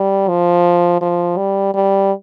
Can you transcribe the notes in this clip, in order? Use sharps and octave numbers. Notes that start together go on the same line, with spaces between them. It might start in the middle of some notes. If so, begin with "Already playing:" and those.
Already playing: G3
F3
F3
G3
G3